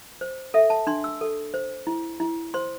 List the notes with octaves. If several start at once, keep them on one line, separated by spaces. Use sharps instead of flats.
C5
A4 E5
A5
D4 C6
E6
A4
C5
E4
E4
C5 C6